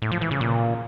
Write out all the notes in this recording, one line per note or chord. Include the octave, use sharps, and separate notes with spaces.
A2
F3
E3
C#3
A#2